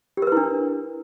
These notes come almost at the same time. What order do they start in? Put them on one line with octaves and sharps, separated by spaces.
G4 A#4 B4 E4 D4